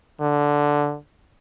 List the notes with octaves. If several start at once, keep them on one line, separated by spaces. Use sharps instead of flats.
D3